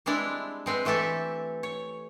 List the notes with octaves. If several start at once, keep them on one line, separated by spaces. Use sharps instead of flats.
G3 G#3 C4 D4 E4
G#3 C4 B4
E3 A3 G4 A4 E5
C#5